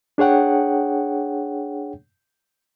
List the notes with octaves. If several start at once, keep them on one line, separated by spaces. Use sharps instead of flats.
D4 G#4 C#5 F#5 G5